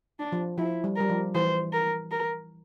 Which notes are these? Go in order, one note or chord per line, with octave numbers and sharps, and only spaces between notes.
D4
F3
F3 E4
G3
G3 A#4
F3
E3 C5
A#4
A#4